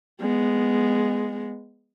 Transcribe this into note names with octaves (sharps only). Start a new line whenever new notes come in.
G#3 B3